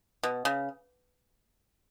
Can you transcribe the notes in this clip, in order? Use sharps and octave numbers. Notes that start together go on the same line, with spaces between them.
B2
C#3